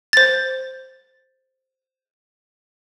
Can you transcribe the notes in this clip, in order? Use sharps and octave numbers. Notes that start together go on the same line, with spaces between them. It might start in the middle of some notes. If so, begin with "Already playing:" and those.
C5 A6